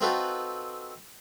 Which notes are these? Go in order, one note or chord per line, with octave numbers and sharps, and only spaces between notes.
C4 D#4 F4 F#4 A4 B4